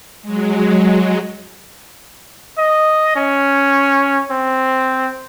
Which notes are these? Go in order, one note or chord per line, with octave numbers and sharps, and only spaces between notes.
F#3 G#3
D#5
C#4
C4